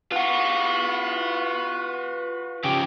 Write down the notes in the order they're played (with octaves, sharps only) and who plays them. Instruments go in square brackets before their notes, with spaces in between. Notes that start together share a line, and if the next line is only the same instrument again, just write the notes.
[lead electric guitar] F4 F#4 [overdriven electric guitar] B4 F#5
[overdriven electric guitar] C#3 F3 [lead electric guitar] G4